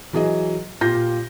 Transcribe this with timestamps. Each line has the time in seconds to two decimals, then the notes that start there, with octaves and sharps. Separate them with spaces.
0.13 E3 F#3 G#4 D#5
0.81 A#2 F4 G4 G6 A#6